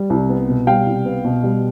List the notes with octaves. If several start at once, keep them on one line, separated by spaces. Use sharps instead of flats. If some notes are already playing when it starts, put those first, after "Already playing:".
Already playing: G3
C2
B3
B2
G3 F5 G5
C2
B3
B2
G3